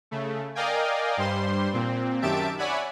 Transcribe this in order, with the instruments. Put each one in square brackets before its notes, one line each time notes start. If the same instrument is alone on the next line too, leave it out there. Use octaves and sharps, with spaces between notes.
[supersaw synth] C#3 A3
A#4 D5 D#5 F5 G5 G#5
G2 G3 C5 C6
A#2 C4
F#2 D#3 G4 E5 A5 D7
C#5 D5 E5 F#5 G#5 B5